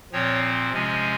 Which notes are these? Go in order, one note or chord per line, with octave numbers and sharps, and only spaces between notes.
A#2 F3 C4 C#5
C3 F3 G#3 C#4